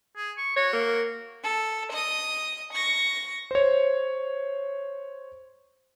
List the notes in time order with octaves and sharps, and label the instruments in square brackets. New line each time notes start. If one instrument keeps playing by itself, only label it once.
[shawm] G#4
C#6
[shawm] F#4 [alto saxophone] C#5
[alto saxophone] A#3
[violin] A4
D#5 D#6
C#6 A#6
[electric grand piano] C5 C#5